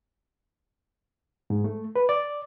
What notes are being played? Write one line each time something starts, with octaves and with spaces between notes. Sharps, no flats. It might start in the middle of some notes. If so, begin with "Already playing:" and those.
G#2
A3
B4
D5